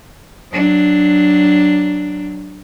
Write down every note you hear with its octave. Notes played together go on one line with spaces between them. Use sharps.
F#3 D4